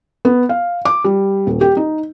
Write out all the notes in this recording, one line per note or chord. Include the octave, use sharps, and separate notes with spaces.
B3
F5
D6
G3
D#1
G4
D#4